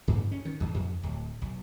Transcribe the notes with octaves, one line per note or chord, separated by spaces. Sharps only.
G2
C#4
D#3
E2
F2
D1
B1